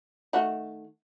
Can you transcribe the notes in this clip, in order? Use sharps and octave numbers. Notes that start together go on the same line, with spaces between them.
D#3 A3 F#4